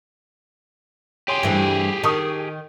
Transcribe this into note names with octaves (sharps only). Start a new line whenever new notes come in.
G4 G#4 C#5 C6
G2 E3 A3 E4 C5
D#3 A5 C#6 D#6